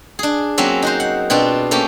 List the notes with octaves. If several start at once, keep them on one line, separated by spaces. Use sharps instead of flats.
D4 G#4
F#3 A#3 C4 C#4 E5
D#4 F#4 C5
F#5
B2 C4 D4 F4
A3 A#3 C#4 G4